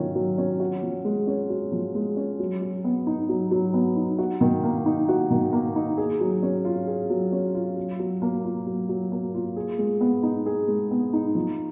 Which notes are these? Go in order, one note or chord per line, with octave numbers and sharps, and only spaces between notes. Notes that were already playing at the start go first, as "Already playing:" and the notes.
Already playing: D#3 F#3 C#4 F4
F#3
C#4
F#4
F3
G#3
C#4
F#4
F3
G#3
C#4
F#3
F#3
B3
D#4
F#3
F#3
B3
D#4
F#4
D#3
A#3
D#4
F#4
D#3
A#3
D#4
G#4
F#3
C#4
F4
G#4
F#3
C#4
F4
F#3
F#3
A#3
F4
F#3
F#3
A#3
F4
G#4
G#3
B3
D#4
G#4
G#3
B3
D#4
F3